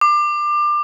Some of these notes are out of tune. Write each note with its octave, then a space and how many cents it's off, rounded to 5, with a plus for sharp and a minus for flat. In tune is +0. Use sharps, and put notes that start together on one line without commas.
D6 +25